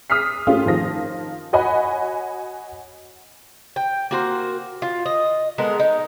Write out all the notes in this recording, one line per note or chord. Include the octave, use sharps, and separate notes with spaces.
D#6 F6 B6 C7
A3 C#4 F4 G4 G#4
D#3 F3 A#6
F#4 C#5 D#5 F#5 G#5 B5
G5
A#3 F#4 C5
F4
D#5
G#3 B3 A4 A#4
D#4